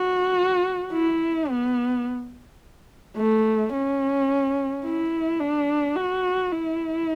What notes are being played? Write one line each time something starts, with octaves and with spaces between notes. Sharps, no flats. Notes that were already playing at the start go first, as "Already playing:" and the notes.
Already playing: F#4
E4
B3
A3
C#4
E4
D4
F#4
E4